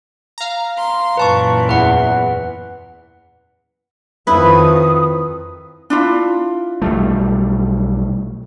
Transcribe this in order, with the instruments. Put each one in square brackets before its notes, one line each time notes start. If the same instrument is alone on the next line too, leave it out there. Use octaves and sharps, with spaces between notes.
[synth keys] F5 A#5
[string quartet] C6
[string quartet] F#2 A#2 E3 [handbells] B4 A5 C#6
[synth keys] E2 [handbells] B4 F#5
[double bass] F2 D#3 [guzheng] E4 B4 [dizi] D#6
[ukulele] D4 E4 F4
[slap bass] B1 G3 A3